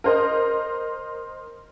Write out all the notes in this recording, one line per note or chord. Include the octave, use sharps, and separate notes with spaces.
A#4 C5 D#5